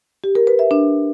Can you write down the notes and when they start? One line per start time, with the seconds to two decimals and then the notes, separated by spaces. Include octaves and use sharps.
0.24 G4
0.35 A#4
0.47 B4
0.59 E5
0.71 D4